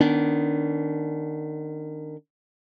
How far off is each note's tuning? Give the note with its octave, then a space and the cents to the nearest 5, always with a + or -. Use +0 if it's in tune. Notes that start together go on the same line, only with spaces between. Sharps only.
D#3 -25 B3 +0 D4 -35